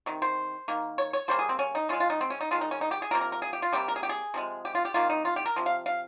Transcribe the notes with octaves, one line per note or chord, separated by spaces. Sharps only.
C3 D#3
C5
D#3 A#3
C#5
C#5
C#3 G3 A#3 C5
G#4
C4
C#4
D#4
C#3 G#3 F4
F4
D#4
C4
C#4
D#4
D#3 G#3 F4
D#4
C#4
D#4
G4
G#4
C3 F3 A#3 A#4
A#4
A#4
G#4
G4
F4
C3 G3 A#3 G4
A#4
G#4
G4
G#4
C3 F3 G#3
G4
F4
G4
C3 D#3 A#3 F4
D#4
F4
G4
A#4
C3 F3
F5
F5